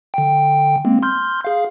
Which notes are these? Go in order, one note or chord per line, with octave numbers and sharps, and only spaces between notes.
D3 G5
G#3 A#3 C4
C6 F6 G6
G#4 F5